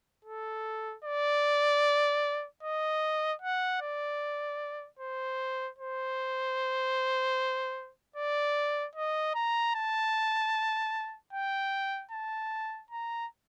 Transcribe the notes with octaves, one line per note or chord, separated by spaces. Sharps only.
A4
D5
D#5
F#5
D5
C5
C5
D5
D#5
A#5
A5
G5
A5
A#5